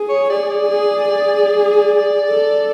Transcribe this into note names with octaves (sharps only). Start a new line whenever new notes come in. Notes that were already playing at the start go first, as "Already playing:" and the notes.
Already playing: G#4
C#5
G#4 D5
D5
G#4
G#4
D5
A4